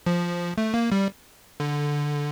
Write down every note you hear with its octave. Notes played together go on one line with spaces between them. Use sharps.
F3
A3
A#3
G3
D3